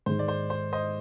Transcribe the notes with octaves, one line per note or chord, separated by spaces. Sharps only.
G#2 D#3 G#3 C5
D5
C5
C5
C5 D#5